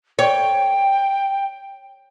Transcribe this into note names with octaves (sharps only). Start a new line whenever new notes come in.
C#5 G5